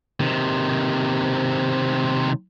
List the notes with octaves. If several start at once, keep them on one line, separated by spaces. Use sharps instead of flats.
C3 D#3